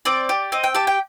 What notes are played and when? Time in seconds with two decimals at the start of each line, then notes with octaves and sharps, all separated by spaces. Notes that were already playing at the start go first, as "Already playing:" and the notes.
0.05 C4 D5
0.29 G4
0.52 C4 D#5
0.64 G5
0.75 G4 A5
0.87 G5